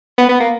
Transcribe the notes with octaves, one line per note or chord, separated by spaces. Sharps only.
B3
B3
A#3